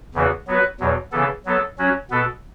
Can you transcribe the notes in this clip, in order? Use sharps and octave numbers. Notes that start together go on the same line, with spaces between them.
E2 C#3 E3 B3 F#4
F#3 B3 F#4 B4
E2 B2 F#3
C#3 E3 B3 A4
F#3 B3 A4
F#3 C#4 F#4
B2 B3 A4